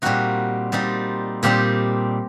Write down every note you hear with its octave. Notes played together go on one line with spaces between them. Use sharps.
A#2 G3 C4 D#4 F#4
A#2 G3 C4 D#4
A#2 G3 C4 D#4 G4